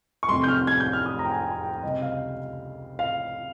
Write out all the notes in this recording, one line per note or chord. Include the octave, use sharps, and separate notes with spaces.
C#6
F1 F2 C3 G3 C6
G6
F6
G#6
G6
F6
D#6
A#5
G5
G#5
G#5
G5
C#2 C3 G3 D#5
F5
F5